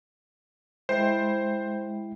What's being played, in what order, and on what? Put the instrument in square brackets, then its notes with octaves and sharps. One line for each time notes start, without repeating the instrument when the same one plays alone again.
[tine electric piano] G#3 E4 G5 [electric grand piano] C5